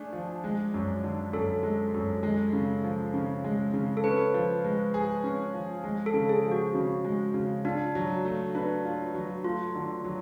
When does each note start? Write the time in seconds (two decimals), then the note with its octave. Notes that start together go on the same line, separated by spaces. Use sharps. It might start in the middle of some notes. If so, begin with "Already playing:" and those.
Already playing: A3 D4 G#4
0.13 F3
0.44 G#3
0.74 F#2
1.04 D3
1.33 F#2 A4
1.63 G#3
1.94 F#2
2.23 G#3
2.53 C#3
2.84 F3
3.14 C#3
3.44 G#3
3.73 C#3
3.97 A4
4.04 C#4 B4
4.34 F3
4.65 G#3
4.94 G#4
5.24 C#4
5.54 F3
5.84 G#3
6.06 A4
6.14 C#3
6.29 G#4
6.44 F3
6.51 F#4
6.75 C#3
7.05 G#3
7.34 C#3
7.65 D4 F4
7.95 F#3
8.25 A3
8.55 D4 B4
8.85 F4
9.14 F#3
9.44 A3 F4
9.75 D3
10.05 F#3